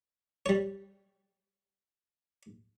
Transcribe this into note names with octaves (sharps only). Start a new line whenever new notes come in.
G3 C#5